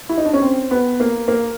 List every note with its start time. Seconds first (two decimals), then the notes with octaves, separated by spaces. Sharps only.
0.09 E4
0.18 D#4
0.25 D4
0.33 C#4
0.42 C4
0.71 B3
1.00 A#3
1.28 A#3